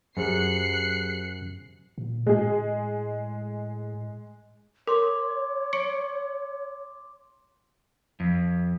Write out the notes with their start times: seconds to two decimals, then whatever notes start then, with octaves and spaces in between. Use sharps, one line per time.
0.17 F#2 G4 G#4 C5 F#6 C7 C#7
1.98 A#2
2.26 A2 G#3 G#4
4.87 A#4 C#5 C6 D6
5.73 C#6 C#7 D7
8.20 F2